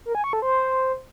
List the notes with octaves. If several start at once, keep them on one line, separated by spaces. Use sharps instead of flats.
A#4
G#5
C#6
A4
C5